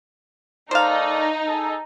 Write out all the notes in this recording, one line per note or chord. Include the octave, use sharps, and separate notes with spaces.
A3 D#4 A#4 C5 D5 F5
G#4 A4